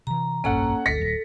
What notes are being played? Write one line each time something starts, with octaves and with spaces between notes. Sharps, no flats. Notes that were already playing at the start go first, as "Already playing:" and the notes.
C3 E3 A#5
F1 A#1 G2 A#3 C#4 A4 F#5 A#5
G1 D2 A4 A#6 B6 C#7
D1 F#3